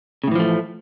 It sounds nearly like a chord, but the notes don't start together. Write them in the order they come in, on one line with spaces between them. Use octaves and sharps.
C#3 A2 E3 F3 A3